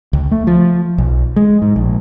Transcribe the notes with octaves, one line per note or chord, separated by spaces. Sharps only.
C#2
A3
F3
B1
G#3
G#2
A#1